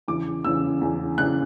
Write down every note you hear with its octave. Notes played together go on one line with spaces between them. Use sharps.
E2 C#3 E3 D6
E2 C#3 E3 E6
E2 C#3 E3
E2 C#3 E3 F#6